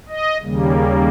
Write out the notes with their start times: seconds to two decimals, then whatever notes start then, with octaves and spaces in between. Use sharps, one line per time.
0.09 D#5
0.40 D#2 C#3 G3 A#3